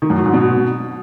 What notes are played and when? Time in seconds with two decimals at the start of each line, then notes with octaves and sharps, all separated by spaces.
0.02 D#3
0.10 F#2
0.18 F#3
0.26 G#2
0.33 B2